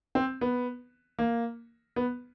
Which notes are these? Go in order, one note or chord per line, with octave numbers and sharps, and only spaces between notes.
C4
B3
A#3
B3